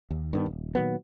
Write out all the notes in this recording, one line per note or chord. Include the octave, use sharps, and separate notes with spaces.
D#2
G2 D#3 B3
D#1
A#2 D#3 F#3 B3